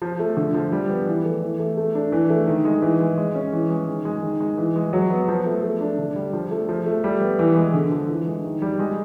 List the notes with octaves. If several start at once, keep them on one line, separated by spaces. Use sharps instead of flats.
F3
A3
D3
F3
G3
B3
E3
A3
E3
A3
A3
D4
E3
A3
D#3
G#3
E3
G#3
G#3
C#4
E3
G#3
D#3
G#3
D#3
G#3
E3
G#3
F#3
B3
F3
A3
A3
D4
D3
G3
F3
A3
F3
A3
G3
B3
E3
G#3
D3
F3
E3
G#3
D#3
G3
G#3